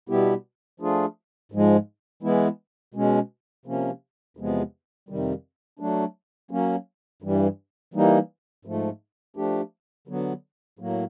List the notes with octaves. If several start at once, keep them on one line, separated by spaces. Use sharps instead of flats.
B2 G3 B3 E4 G4
F3 A3 D4 F4 G#4
G#2 F3 G#3
E3 G#3 B3 E4
B2 G#3 C#4
C3 F3 A#3 C#4
E2 C3 F3 G#3 B3
F2 C3 D#3 G3
F#3 A3 D4
F#3 A#3 C#4
G2 E3 G3
E3 G3 A#3 D#4
G#2 F3 A3
F3 A3 D4 G4
D3 F#3 B3
A2 F#3 A#3